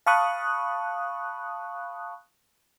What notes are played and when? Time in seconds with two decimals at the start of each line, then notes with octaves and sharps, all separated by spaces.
0.06 F5 A5 B5 C#6 D#6 F#6